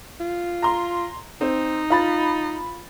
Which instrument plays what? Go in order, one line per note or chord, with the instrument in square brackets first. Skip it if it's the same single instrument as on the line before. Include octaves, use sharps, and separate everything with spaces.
[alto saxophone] F4
[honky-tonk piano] A#5 C6
[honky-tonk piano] C4 [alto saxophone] D#4
[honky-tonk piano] F4 B5 A6